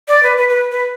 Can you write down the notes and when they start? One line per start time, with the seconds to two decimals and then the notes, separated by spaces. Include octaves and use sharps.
0.08 D5
0.23 B4
0.37 B4
0.49 B4
0.71 B4